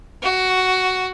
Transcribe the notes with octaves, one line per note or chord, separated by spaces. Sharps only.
F#4